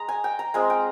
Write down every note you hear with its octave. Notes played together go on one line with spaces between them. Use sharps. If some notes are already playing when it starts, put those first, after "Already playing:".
Already playing: G#3 A#5
G#5
G5
A#5
G#3 C4 F4 G#5
G5